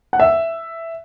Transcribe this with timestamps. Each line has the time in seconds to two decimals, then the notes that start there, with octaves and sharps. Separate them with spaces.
0.13 F#5
0.20 E5